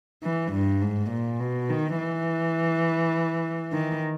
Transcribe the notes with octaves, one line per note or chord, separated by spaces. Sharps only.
E3
G2
G#2
A#2
B2
D#3
E3
D#3